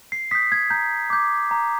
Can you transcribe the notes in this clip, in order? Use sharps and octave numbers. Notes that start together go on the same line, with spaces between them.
C7
D#6 G6 B6
G#6
A#5 G6
D6 G6
A#5